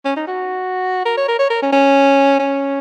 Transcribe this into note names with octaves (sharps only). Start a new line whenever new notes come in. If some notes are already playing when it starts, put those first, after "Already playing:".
C#4
D#4
F#4
A#4
C#5
A#4
C#5
A#4
C#4
C#4
C#4